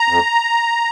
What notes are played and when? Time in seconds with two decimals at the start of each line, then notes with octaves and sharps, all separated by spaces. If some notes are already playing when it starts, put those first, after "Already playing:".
Already playing: A#5
0.08 F2